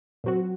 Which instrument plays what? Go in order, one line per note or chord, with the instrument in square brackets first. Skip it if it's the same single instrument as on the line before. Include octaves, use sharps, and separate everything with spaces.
[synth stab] A#2 F#3 C4 F#4